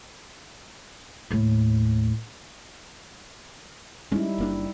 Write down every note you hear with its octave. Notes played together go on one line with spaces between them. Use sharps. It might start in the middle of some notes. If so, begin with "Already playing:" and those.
D#2 A2
G3 G#3 C#4 D#4 E4
F#1 A#3 D4